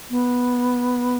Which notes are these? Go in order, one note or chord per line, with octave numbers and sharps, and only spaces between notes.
B3